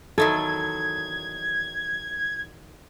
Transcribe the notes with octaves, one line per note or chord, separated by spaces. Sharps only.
E2 D#3 F#3 A4 G#6